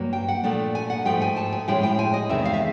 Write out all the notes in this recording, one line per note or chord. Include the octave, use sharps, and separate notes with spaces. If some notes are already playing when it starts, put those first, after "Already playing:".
Already playing: G2 F#3 A#3
G5
F#5
A#2 F3 A3 D4
G#5
F#5
G#2 F3 A3 G5
G#5
A5
G#5
A2 F3 G#3 C#4 E4 G5
G5
G#5
D#5
E2 C3 D#3 G#3 E5
F5
E5